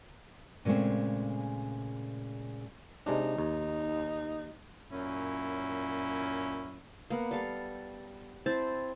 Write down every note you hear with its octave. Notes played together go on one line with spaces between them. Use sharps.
A#2 C#3 G#3 A3 C4
C3 G#3 D4 D#4
D#2
F#2 A#2 C#4 E4
A#3 B3 F#5
G3 A4 F5
C4 E4 C5 A5